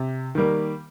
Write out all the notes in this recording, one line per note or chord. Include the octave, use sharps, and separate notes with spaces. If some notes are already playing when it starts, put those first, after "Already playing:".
Already playing: C3
D#3 G3 A#3